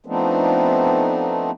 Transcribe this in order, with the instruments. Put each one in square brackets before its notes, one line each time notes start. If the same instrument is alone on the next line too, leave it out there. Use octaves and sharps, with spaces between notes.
[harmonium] F3 A3 B3 C4 D4 D#4